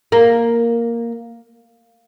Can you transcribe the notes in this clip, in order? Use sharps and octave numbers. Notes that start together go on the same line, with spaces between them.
A#3